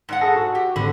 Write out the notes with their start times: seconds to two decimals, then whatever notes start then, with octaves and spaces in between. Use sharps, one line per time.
0.09 G#2 D4 F#5
0.21 G#4 A4 A#6
0.36 F#4
0.55 G4
0.76 G#1 D3 B5